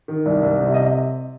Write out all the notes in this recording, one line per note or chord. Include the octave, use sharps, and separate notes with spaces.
D#3
C2
C2
C3
D#5